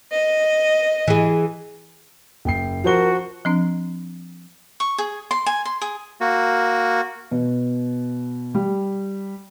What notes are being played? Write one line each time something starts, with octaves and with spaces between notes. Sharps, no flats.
D#5
E3 G#4
F#1 G5 C7
F3 F#4 A#4 C5 G7
F3 C4 D4
C#6
G#4
C6
G#5
C6
G#4
A#3 F#4
B2
G3